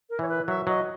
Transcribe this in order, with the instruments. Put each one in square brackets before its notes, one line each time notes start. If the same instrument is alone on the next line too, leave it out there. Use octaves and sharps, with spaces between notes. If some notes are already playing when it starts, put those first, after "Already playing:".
[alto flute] A#4
[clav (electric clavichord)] E3 [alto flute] C#5
[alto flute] B4
[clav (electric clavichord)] F#3 [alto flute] E5
[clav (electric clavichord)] F#3 [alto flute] D#5